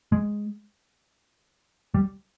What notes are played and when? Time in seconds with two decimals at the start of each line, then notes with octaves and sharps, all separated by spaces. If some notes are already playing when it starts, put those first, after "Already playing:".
0.12 G#3
1.94 G3